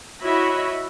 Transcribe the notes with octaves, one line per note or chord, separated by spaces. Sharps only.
E4 F#4 C#5 D#5 E5 B5